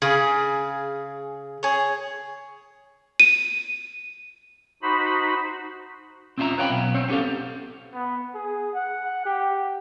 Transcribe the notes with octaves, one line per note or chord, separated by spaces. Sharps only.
C#3 G#4
G#4 C#5
D#7
D#4 F#4 C5 B5
C4 C#4 E4 F4 E5 A#5
B4 C#5 F5 G5 G#5 B5
B1 B3
C4 C5 C#5
B3 C#4 G4 A4 F5
B3
G#4
F#5
G4